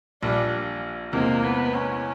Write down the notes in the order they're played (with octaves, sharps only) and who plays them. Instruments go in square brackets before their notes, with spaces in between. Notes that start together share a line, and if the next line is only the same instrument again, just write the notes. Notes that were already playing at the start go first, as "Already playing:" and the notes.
[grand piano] A#1 A#2 G3 [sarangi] D4
[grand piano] E2 C3 E3 G#3 C4 [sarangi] A#3
[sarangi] B3
C#4